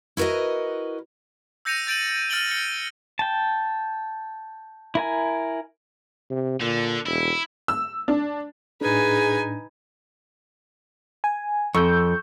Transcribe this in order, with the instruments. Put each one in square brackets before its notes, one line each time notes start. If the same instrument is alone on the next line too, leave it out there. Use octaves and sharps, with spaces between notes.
[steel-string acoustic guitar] E4 F#4 A#4 B4 D#5
[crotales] E6 G6 A#6 C#7 D#7 F7
G6 A6 D7 D#7 F#7
F6 A6 D7 D#7 F#7 G7
A#6 C#7 G7
[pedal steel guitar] G5 A5
E4 A#4 G#5
[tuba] C3
[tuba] A#2 [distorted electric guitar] D3
[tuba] E1 [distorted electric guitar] E4
[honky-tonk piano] E6
D4
[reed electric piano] A2 D4 [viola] D#4 G#5 [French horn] G#4 [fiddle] B4
[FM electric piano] G#5
[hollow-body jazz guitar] F2 [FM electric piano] C#6 E6 G6